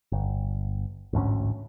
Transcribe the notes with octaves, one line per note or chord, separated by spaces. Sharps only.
G1
A1 D2 G#2 C#4